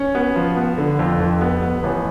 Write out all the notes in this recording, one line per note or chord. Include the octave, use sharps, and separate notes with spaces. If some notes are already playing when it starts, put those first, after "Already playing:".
Already playing: C#4
B3
F3
B3
D3
F2
F2
B3
B3
A1